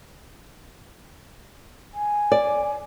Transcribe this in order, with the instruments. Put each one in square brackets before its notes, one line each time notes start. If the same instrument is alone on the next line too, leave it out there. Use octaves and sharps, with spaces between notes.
[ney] G#5
[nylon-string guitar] D5